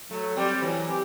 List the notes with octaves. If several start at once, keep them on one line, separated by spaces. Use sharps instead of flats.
F#3 A3
G3 C4 G4
E3 F#3
C4 G4